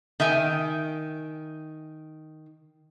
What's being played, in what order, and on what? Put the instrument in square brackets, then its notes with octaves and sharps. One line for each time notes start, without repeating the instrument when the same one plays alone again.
[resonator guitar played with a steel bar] D#3 E5 G5 G#5